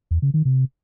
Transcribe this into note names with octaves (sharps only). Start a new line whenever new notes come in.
E2
C#3
D#3
C3